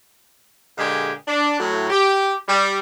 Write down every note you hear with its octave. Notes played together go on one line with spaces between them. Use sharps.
A#2 D3 G#3 G4 G#4
D4
A2 F#3
G4
G3